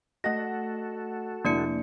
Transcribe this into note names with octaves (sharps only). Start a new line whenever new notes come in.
A3 F#4 A4 D#5 F#5 A#6
F1 A#3 D4 E4 D5 C#7